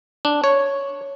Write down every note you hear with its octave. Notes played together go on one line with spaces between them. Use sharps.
D4
C#5